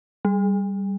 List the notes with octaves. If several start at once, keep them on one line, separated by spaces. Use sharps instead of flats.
G3